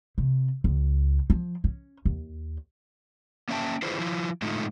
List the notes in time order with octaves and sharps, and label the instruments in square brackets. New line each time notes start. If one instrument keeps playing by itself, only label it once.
[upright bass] C3
C#2
F3
C#4
D#2
[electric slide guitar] A#3 C#4 E5 G5 A5
E4 F4 G#4 B4 C5
F3 E4 F4
A2 D3 G#3 A3 D#4 F4